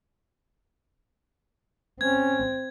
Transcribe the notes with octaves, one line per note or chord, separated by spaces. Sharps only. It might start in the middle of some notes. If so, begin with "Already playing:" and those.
C4 C#4 G#6